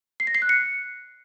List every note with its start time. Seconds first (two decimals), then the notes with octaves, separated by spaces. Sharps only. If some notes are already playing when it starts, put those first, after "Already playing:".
0.20 C7
0.27 A#6
0.35 C7
0.42 F#6
0.49 C#7